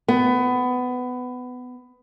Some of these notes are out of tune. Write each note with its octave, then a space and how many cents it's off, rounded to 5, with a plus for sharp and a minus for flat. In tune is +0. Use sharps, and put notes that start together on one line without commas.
B3 +20